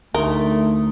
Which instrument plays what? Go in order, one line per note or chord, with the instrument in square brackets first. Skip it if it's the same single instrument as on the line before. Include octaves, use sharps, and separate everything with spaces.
[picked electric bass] D2 [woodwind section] A3 [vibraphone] D#4 C6 D#6 [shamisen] A#4